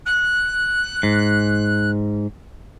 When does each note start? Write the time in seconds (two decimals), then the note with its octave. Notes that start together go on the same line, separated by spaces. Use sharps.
0.05 F#6
1.03 G#2